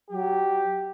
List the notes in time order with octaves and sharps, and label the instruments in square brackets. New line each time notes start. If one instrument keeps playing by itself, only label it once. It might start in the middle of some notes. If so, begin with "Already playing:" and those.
[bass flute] F#3 [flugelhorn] G4